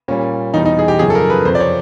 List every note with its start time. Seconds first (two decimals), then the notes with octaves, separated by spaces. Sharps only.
0.08 A#2 G3 C#4
0.54 E2 B2 G3 D#4
0.65 D#4
0.79 G#4
0.88 G4
0.99 F#2 C#3 F3 G#4
1.10 A4
1.15 A#4
1.30 B4
1.45 F2 C3 F3 C5
1.55 D5
1.60 C#5